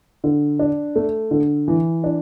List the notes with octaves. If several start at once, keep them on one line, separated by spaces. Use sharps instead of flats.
D3
D4
A3
D3
E3
D4